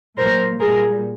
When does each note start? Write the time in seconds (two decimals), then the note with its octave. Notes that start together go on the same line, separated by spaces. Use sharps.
0.18 A#2 F#3 A#4 C5
0.59 A#2 G3 G#4 A#4